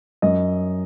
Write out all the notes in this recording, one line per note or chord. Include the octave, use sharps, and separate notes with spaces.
F#2 D#5